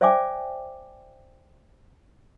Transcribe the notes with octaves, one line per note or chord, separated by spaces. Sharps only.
C5 D5 E5 G5 G#5 D6